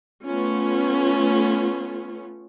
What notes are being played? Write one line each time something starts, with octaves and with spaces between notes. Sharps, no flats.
A3 B3 C#4 F4